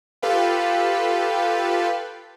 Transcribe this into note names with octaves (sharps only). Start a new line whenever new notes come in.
F4 G4 A4 B4 F5 G5